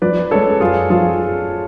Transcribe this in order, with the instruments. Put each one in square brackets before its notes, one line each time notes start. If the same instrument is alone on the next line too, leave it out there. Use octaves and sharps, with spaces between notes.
[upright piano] F3 [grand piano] B4 D5
[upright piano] G#3 C#4 [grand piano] A4 C#5
[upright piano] F#2 [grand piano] F4 G#4
[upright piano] F3 [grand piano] F4 G#4